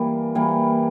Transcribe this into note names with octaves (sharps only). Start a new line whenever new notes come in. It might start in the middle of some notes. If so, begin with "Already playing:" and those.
Already playing: E3 G3 A#3
E3 G3 A#3